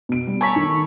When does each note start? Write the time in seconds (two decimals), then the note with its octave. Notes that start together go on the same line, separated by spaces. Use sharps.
0.09 B2 D7
0.27 G3
0.41 A4 C#5 G#5 A#5 B5
0.56 D#3